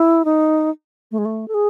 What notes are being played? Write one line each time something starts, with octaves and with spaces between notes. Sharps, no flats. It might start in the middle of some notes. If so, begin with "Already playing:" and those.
Already playing: E4
D#4
A3
G#3
A3
A4
G#4